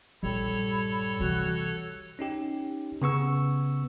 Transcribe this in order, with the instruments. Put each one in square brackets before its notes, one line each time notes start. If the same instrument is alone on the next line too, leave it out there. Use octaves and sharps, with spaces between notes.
[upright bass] A#1 G2 [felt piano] G3 [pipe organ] A4 C#5 [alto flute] B5
[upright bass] C3 E3 [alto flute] F#4
[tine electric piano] C#4 D#4 G4
C#3 B3 C#6 E6